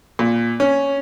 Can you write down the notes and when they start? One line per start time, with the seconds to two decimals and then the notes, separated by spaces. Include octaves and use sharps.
0.19 A#2
0.60 C#4